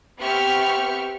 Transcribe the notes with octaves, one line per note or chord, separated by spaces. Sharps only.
B3 C4 G4 E5 C#6 F6